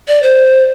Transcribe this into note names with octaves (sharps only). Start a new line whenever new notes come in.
D5
C5